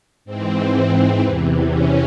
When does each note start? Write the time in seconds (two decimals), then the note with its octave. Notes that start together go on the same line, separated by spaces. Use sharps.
0.25 G#2 E3 C4
0.73 C4
1.21 E2 C3 E3
1.68 C#4